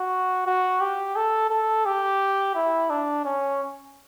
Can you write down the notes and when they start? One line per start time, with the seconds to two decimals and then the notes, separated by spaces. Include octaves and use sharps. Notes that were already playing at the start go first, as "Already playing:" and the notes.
Already playing: F#4
0.47 F#4
0.81 G4
1.16 A4
1.50 A4
1.86 G4
2.55 E4
2.90 D4
3.25 C#4